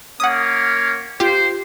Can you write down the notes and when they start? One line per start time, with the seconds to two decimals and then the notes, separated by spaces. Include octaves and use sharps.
0.20 A#3 C#4 F#5 D#6
1.20 F4 G4 C5